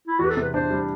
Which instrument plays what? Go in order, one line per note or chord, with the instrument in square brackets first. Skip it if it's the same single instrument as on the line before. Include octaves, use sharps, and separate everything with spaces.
[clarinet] E4
[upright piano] E2 [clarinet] F#4
[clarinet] B4
A4
[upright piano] C3
[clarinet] B4
[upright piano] D4 [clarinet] C5
[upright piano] G3